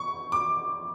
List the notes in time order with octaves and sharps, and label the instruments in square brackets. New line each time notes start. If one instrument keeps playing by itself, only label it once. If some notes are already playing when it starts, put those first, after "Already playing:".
Already playing: [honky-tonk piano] C#6
D6